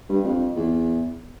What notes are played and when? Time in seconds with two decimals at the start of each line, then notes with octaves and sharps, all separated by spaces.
0.09 G2
0.25 F2
0.56 E2